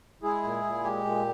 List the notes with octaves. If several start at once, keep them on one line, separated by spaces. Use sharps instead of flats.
G#3 E4 G#4
A#2
A#2
G#3 G4
A#2